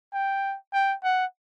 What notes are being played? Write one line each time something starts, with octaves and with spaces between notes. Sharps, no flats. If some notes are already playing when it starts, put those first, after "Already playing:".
G5
G5
F#5